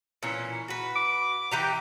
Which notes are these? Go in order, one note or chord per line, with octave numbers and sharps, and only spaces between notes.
A#2 E3 C#4
F#4 B4
D6
E3 G4 A#5